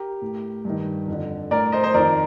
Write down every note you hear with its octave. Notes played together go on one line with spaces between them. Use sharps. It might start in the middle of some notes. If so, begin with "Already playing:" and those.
Already playing: G4 A#4
A2
G2 D#3
F2 D3
A2 A#4 D5
C5 D#5
C5 D#5
F2 D#3 A#4 D5